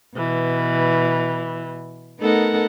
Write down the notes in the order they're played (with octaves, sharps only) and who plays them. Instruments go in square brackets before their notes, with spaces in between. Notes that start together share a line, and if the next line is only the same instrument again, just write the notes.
[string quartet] B2 E3
A3 B3 D#4 A4 A#4 F#5